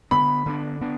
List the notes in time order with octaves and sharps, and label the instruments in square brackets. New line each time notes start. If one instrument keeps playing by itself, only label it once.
[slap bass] D3 B3 D4 [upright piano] B5
[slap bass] D3 B3 D4
D3 B3 D4